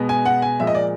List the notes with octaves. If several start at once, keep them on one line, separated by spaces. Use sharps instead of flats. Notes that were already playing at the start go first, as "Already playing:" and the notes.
Already playing: B2 G#3 B3
G#5
F#5
G#5
A#2 F3 G#3 E5
D#5
D5